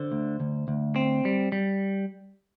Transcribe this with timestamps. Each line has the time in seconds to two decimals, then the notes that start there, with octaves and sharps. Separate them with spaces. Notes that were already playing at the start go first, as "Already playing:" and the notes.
Already playing: D3 C5
0.12 D2
0.40 D2
0.68 D2
0.96 C4
1.25 G3
1.52 G3